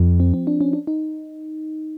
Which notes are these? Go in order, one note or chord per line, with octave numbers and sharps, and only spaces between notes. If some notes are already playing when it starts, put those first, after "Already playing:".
Already playing: F2 F3
C4
C4
D4
C#4
D4
D#4